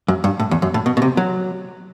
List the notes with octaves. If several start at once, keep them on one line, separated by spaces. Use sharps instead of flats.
F#2
G2
A2
E2
F#2
A2
B2
B2
C3
F#3